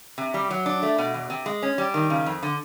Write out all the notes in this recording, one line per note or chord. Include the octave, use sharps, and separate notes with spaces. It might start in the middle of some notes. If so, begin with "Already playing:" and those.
C3
G3
F#3
D4
A3
B2
E2
C3
G#3
C#4
G3
D#3
C#3
F2
D3